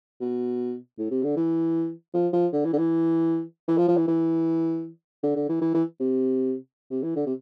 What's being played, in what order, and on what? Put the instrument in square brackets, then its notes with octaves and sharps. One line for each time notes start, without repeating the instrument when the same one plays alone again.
[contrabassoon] B2
A2
C3
D3
E3
F3
F3
D3
E3
D3
E3
E3
F3
F3
E3
E3
D3
D3
E3
E3
E3
C3
C3
E3
D3
C3